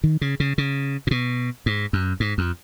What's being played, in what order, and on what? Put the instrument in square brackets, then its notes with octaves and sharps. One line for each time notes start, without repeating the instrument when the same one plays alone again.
[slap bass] D#3
C#3
C#3
C#3
A#2
B2
G#2
F#2
G#2
F2